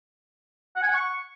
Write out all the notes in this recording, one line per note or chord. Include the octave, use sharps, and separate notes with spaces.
F#5
G#5
F#5
C#6